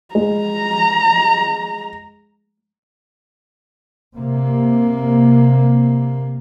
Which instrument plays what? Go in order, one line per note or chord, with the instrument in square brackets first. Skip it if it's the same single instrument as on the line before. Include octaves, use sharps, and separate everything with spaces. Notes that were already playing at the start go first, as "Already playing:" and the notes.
[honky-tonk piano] G#3 [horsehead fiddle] A#5
[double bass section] C3 A#3